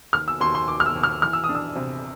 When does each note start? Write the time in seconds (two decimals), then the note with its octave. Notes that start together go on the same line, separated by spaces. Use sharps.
0.13 D#2 F6
0.28 E6
0.40 D#2 C6
0.55 C6
0.67 D#2 D6
0.80 F6
0.86 E6
0.95 D#2
1.03 F6
1.22 E3 F6
1.33 E6
1.44 D#6
1.49 D4
1.55 E6
1.76 C3